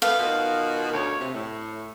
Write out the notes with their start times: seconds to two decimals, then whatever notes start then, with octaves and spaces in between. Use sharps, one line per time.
0.02 A3 B3 B4 F5
0.19 B2 D#3 F4
0.93 D2 C#5
1.21 C3
1.34 A2